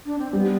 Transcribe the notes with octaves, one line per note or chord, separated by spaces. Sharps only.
D4
C4
G3 B3